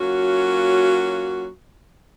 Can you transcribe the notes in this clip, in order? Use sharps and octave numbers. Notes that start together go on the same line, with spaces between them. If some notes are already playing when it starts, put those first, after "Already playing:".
F#3 A#3 C#4 F4 F#4